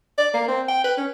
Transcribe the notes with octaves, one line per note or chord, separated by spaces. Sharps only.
D5
A#3
C4
G5
B4
C#4